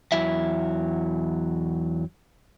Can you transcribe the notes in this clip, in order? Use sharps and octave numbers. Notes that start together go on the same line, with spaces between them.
E2 F#3 E4 E5